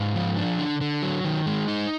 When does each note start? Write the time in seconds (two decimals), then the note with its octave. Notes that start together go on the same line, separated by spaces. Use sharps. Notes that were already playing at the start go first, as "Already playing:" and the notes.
Already playing: G#2 F5
0.15 F3
0.37 D4
0.59 D3
0.81 D3
1.03 F#3
1.24 D#3
1.46 G#3
1.68 D#4